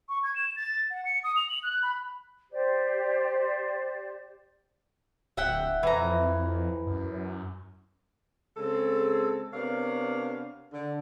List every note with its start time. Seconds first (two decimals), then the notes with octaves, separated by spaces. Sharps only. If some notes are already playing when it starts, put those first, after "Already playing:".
0.09 C#6
0.24 G#6
0.36 E7
0.56 A6
0.90 F#5
1.05 C#7
1.24 D#6
1.36 F7
1.49 F#7
1.63 F#6
1.83 B5
2.51 G4 C5 D5
5.37 D1 E5 F#5 G5
5.83 F2 E3 A#5
6.87 F#2
8.57 C#3 G#3 C4 A4
9.53 C3 B3 D4 A#4 C#5 F5
10.73 D3